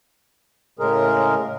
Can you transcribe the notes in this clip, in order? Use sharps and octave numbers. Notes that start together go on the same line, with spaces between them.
A2 C#3 G#3 G#4 A#4